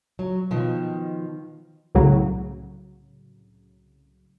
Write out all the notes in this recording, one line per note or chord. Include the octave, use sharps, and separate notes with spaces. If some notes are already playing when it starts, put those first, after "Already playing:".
F#3
B2 D#3 F3
C2 A2 C#3 F#3